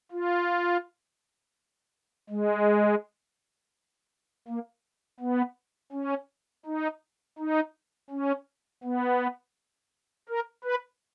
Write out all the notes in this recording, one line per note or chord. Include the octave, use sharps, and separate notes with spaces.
F4
G#3
A#3
B3
C#4
D#4
D#4
C#4
B3
A#4
B4